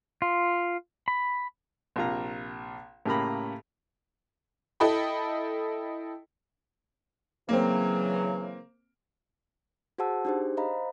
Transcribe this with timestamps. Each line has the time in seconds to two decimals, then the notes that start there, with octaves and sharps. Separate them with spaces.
0.22 F4
1.08 B5
1.96 A#1 C3 F4 A#5
3.06 A2 C#3 A#3 G4 A#5 B5
4.80 E4 A4 D#5 G5 B5
7.49 C#3 E3 F#3 A#3 C4
9.98 F#4 G#4 C5 F#5 A5 E6
10.25 D4 D#4 G4 G#4 C5
10.57 C5 D#5 F5 A#5 B5